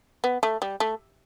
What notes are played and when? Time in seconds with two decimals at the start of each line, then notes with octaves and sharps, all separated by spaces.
0.24 B3
0.43 A3
0.62 G3
0.80 A3